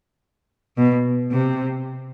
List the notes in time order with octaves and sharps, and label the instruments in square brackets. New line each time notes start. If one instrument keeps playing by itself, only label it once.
[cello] B2
C3